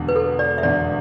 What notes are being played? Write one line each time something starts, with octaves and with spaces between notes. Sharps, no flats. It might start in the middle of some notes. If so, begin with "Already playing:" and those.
Already playing: E1 E2 D3
B4
A4
D5
E5
E1 E2 D3 D5